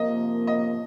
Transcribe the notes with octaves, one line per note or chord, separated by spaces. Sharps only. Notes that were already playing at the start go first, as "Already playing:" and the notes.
Already playing: C3 F3 A#3 D#5
D#5